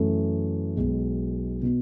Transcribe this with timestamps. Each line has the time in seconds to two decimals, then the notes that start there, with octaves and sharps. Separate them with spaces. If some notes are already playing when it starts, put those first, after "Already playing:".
Already playing: F#2 E3 A3
0.77 B1 B2 G#3
1.62 B2